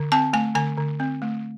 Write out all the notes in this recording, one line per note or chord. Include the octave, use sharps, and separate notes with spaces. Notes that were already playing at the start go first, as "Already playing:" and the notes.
Already playing: D3
C4 A5
A3 G#5
D3 G#5
D3
C4
A3